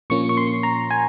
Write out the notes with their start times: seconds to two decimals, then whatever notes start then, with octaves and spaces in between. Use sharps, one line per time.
0.10 A#2 F3 A#3 C#4 C#6
0.29 C#6
0.37 C6
0.63 A#5
0.91 G#5